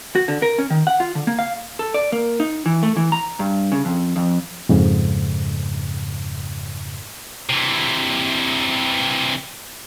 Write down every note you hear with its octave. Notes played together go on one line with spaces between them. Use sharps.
F#4
D3
A#4
C#4
D#3
F#5
F4
D3
A#3
F5
A4
D5
A#3
D#4
E3
A3
E3
A#5
G2
C#3
F2
F2
F2 G#2 C#3
C3 E3